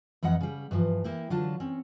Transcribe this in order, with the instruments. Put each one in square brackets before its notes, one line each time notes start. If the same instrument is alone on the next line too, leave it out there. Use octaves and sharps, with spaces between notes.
[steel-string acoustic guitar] F2 E3 G3 D#5 F#5
C#3 G3
G2 E3 F3
A#3 E4 G4
D3 F#3 F4 A5
C4 C#4